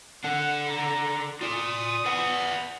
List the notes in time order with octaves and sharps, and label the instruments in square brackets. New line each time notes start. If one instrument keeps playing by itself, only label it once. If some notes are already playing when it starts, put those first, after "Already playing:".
[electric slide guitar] D4 A4 [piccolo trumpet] F#5
[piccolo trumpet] A#5
[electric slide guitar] F4 D5 [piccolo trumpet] D#6
[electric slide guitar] B4 D5 F#5